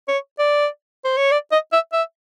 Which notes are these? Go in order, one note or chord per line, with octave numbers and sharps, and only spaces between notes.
C#5
D5
C5
C#5
D5
D#5
E5
E5